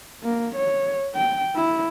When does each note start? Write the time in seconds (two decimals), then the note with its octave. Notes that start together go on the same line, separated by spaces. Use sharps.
0.23 A#3
0.55 C#5
1.15 G5
1.55 E4